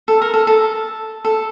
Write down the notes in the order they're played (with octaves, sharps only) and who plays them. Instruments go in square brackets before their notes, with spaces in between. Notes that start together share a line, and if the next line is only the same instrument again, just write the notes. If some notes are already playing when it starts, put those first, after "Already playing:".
[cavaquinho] A4
A#4
A4
A4
A4